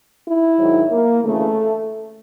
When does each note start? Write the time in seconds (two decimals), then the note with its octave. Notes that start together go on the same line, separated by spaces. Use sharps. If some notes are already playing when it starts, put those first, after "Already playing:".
0.25 E4
0.58 G#2 D#3 F#3
0.90 A#3
1.24 D2 C#3 E3 A3